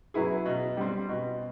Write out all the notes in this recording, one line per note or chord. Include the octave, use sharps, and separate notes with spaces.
F#3 B3 E4 G#4
B2
G3 C4
B2